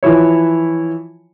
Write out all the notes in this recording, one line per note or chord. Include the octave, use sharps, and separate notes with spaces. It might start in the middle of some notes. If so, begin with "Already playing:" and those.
E3 F3 E4 C#5